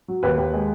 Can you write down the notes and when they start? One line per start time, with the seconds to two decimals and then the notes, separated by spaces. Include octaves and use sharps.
0.08 F#3
0.23 D#2 B4
0.38 D#2
0.54 G#3